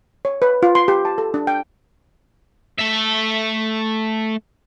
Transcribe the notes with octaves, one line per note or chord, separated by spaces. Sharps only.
C#5
B4
F4
C6
G4
A5
A4
D4
G5
A3 E5